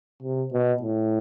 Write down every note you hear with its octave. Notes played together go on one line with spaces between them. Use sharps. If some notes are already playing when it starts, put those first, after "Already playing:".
C3
B2
A2